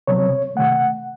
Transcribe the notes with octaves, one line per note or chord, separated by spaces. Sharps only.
C3 F#3 C4 C#5
C3 D#3 A3 F#5
F#5